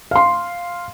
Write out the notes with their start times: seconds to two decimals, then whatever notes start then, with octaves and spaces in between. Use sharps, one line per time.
0.11 F5 C6